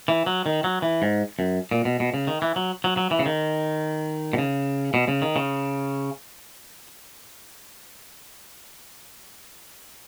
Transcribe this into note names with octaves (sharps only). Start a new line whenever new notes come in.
E3
F#3
D#3
F#3
E3
G#2
F#2
A#2
B2
B2
C#3
D#3
E3
F#3
F#3
F#3
E3
C#3
D#3
B2
C#3
B2
C#3
D#3
C#3